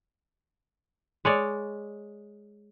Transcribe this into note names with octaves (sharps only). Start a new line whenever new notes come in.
G#3 C#5 D5